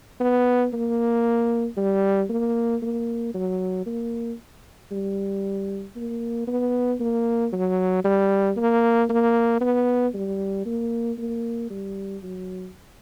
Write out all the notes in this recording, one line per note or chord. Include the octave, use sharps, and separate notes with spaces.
B3
A#3
G3
A#3
A#3
F#3
A#3
G3
A#3
B3
A#3
F#3
G3
A#3
A#3
B3
G3
A#3
A#3
G3
F#3